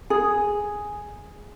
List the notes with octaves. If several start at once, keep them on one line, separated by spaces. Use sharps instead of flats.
G#4